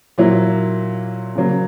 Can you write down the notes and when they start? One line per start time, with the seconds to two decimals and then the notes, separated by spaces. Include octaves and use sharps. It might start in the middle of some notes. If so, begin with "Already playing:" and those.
0.18 A#2 F#3 A#3 E4
1.35 C#3 F#3 A#3